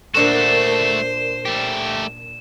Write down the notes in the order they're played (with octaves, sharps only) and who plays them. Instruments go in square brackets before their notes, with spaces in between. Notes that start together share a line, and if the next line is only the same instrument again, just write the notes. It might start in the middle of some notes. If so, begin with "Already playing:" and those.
[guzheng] A#2 D4 A4 [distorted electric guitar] A3 F#4 [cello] C5 [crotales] E7
[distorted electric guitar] A3 G4